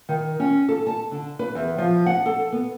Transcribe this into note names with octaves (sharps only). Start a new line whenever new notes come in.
D#3
C#4
A4
A5
D3
B4
E2
F3
F#5
A4
B3